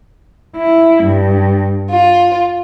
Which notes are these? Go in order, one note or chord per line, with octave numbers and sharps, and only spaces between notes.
E4
G2
F4